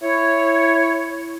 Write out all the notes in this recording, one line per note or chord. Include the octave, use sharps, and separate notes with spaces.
E4 C#5